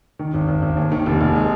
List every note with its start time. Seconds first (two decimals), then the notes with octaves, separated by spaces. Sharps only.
0.19 D#3
0.34 G#1
0.48 G#1
0.62 G#1
0.77 D#2
0.92 D#3
1.06 F1
1.21 F1
1.36 G#3